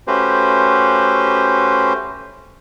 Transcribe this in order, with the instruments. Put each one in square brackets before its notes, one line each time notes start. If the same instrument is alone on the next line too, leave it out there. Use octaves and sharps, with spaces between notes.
[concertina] A3 C#4 F#4 G4 B4 C5